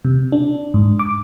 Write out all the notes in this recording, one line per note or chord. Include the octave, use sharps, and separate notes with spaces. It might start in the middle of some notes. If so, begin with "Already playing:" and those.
C3
D4
G#2
D6